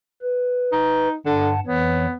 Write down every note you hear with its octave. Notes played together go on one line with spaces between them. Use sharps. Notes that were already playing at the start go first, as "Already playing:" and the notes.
B4
D#4
G2 D3 F#5 A5
F2 E3 B3 C#5